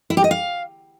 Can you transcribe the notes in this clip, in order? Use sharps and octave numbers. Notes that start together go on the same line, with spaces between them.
E4
G4
D#5
F5